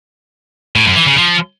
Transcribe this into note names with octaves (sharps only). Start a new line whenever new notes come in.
A2
F#2
E3
C#3
F3